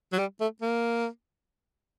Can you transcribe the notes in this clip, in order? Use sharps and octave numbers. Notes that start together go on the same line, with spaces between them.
F#3
G3
A3
A#3